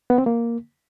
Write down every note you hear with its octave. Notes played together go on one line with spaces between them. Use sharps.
B3
C4
A#3